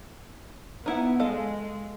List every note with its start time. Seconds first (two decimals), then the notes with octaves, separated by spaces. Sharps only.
0.86 B3 D#4 E4 F#5
1.20 G#3 A4 D#5 F5